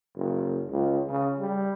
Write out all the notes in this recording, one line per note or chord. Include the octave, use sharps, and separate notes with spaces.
F#1
C#2
C#3
G3